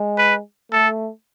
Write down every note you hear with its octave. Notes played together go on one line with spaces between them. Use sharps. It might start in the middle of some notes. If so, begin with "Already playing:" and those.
Already playing: G#3
B4
A3 A4